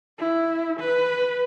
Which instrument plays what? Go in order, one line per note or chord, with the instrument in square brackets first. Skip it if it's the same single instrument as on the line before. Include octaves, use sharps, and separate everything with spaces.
[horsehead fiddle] E4
B4